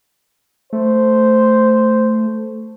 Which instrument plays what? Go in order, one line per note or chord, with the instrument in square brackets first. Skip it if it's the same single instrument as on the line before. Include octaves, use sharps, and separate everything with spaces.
[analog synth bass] A3 [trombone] C5